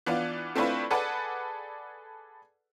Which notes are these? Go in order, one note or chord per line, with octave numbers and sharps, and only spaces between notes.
E3 B3 D4 F4 D5
A3 C4 D4 E4 F4 B4
G#4 A4 B4 D5 F#5